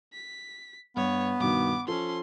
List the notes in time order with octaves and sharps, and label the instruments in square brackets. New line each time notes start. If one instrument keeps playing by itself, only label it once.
[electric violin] B6
[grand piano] G2 [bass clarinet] B3 [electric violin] C#5
[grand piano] G2 B2 D#3 [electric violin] D6
[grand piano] F3 A4 [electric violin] C#4 C6